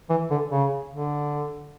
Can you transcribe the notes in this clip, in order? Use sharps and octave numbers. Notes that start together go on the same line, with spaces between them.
E3
D3
C#3
D3